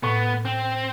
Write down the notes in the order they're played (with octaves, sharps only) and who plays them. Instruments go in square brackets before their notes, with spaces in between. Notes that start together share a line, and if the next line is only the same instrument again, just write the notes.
[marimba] A2 [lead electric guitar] B3
[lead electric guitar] C4